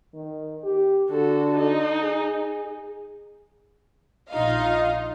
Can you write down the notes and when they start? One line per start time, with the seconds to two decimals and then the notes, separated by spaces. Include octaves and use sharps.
0.14 D#3
0.64 G4
1.10 D3 F#4 A4
1.57 D#4
2.04 G#4
4.30 A#1 D#4 F4 D#5 F5